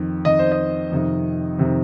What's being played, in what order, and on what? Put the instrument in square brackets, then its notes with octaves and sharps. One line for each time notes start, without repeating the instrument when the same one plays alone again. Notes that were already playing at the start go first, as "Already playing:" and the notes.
Already playing: [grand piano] F2 D#3
F2 D#3 D#5
C5
D#5
F2 C3 D#3
F2 C3 D#3